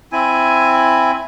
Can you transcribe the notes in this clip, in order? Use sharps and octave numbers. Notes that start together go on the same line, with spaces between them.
C4 E4 G#5